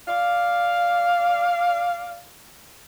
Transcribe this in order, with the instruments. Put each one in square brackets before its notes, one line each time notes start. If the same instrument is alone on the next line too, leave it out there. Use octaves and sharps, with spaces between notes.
[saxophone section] D5 F5